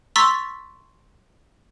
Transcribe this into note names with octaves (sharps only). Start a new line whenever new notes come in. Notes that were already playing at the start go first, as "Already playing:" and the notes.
A#5 C6 C#6 E6 A6 B6